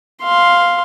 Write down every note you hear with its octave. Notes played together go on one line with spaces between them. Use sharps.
F5 C6